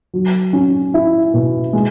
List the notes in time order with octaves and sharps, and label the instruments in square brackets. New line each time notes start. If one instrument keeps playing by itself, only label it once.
[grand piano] F#3
C#4
E4
B2
G#3